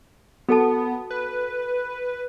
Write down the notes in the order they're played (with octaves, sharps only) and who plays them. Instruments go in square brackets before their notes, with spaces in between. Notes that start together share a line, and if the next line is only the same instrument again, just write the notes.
[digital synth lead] B3 [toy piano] F#4 A4 A5
[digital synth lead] B4